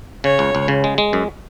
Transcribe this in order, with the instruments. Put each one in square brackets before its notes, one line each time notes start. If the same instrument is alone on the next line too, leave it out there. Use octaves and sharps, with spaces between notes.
[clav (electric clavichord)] C#3 [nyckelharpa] C#5
[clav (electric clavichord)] C#2
C#2
C#3
G#3
G#3
F#2